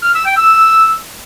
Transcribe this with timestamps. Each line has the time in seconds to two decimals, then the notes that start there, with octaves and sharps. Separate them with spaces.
0.03 F6
0.14 E6
0.25 G5
0.36 E6